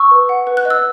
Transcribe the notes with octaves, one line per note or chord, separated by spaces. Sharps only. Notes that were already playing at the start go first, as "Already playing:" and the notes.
Already playing: C#6 E6
B4
F#5
B4
F#6
D#5
E6